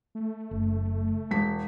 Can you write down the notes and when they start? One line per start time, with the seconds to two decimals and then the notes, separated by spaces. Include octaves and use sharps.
0.15 A3
0.51 F#1
1.31 E1 G#3 B6